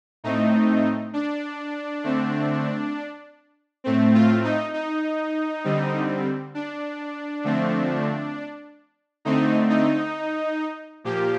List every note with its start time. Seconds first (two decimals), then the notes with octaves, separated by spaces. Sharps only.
0.24 A2 A3 C4 D#4
1.13 D4
2.04 D3 A3 C4
3.84 A2 A3 C4
4.14 F4
4.44 D#4
4.74 D#4
5.64 D3 G3 C4
6.54 D4
7.44 D3 F3 A3 C4
9.25 D3 A3 C4 D#4
9.70 D#4
11.04 A#2 F3 A#3 G4